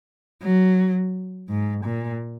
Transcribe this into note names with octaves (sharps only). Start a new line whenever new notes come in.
F#3
G#2
A#2